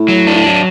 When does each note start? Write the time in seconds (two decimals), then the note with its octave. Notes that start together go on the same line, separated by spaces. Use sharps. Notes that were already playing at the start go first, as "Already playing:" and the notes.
Already playing: A2
0.08 F#3
0.27 D4
0.35 A2
0.46 F#3